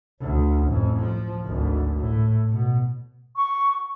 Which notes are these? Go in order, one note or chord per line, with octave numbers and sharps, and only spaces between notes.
D2
A1 F2
F3
G#1 D2
A2
B2
C#6